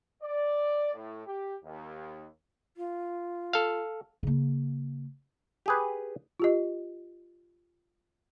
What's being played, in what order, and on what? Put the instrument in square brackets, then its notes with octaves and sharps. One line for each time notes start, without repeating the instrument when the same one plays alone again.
[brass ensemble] D5
A2
G4
D#2
[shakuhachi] F4
[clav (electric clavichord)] A4 F5
[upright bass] C#3 A#3
[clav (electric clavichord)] G4 G#4 B4
[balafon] F4 G4 D#5